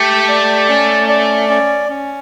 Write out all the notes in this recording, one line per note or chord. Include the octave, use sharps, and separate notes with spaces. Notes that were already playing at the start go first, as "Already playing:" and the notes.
Already playing: A3 G4
D5
C#4
D5
C#4
C#4